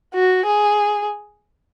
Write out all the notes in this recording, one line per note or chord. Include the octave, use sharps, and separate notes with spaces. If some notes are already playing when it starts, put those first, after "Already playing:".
F#4
G#4